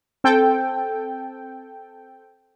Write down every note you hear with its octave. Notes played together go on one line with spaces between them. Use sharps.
C4 A4 G5